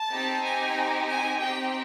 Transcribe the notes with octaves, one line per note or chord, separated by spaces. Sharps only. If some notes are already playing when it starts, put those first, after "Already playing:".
Already playing: A5
C4 D#4 G4
G#5
G#5
C4 D#4 G4 G5